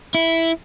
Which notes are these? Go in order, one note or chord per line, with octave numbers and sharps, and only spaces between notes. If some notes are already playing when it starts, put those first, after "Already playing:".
E4